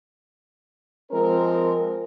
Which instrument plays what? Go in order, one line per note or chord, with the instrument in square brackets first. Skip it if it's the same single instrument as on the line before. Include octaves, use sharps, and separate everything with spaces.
[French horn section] F3 G#3 C4 A#4